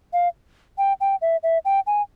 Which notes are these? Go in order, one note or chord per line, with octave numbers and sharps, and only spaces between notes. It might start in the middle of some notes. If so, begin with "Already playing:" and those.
F5
G5
G5
E5
E5
G5
G#5